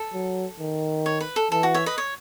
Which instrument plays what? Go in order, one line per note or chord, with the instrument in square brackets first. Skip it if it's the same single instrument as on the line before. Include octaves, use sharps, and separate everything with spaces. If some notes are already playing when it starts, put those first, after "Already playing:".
Already playing: [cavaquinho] A4
[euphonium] F#3
D#3
[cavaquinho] C#5
B4
A4
[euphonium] E3 [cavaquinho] A4
[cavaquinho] F#4
C#5 E5
B4 D#5
C#5